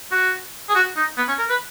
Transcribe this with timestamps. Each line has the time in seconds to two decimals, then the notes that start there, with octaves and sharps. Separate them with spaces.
0.12 F#4
0.69 G#4
0.75 F#4
0.96 D#4
1.17 B3
1.28 C#4
1.39 A#4
1.49 B4